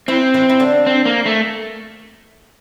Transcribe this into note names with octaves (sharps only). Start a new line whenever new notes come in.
E3 C4 E4
E3 E4
E4
D3 D4
C4
A#3
A3